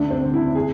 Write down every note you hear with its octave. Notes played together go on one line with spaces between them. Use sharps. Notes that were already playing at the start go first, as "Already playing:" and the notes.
Already playing: D2 D4
C4
D3
E4
G#4